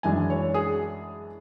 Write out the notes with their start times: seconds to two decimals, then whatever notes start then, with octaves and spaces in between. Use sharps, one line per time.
0.03 F#2 E3 G#3 D4 G#5
0.30 C#5
0.54 G#4